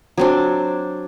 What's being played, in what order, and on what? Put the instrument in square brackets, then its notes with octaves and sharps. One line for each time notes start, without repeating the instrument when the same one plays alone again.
[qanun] F#3 C4 D4